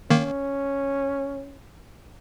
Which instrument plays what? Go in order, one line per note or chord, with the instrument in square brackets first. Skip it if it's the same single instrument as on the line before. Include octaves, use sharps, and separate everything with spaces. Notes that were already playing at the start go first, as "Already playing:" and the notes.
[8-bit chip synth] D#3 A#3 [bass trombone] C#4